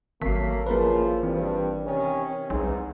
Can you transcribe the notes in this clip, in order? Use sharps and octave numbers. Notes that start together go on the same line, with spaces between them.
G#1 F#3 A3 A#3 B6 C7
C#3 E3 F3 A#3 A#4 B4
G2 E3 C4
C3 D#3 C#4
B1 E2 G#2